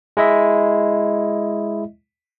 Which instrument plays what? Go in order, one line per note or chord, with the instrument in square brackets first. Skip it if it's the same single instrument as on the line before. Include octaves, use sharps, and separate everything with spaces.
[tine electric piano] G#3 E4 D#5 E5